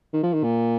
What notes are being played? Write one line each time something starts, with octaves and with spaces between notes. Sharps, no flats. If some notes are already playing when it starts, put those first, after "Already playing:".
D#3
F3
D#3
A#2